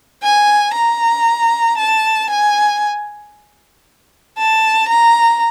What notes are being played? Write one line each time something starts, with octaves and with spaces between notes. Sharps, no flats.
G#5
A#5
A5
G#5
A5
A#5